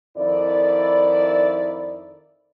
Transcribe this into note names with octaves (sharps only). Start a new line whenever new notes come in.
F2 D#3 E4 D5